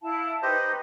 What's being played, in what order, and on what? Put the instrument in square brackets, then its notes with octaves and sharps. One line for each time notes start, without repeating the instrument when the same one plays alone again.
[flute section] E4 F5 A5
[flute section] D#4 B4 [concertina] G4 C5 D#5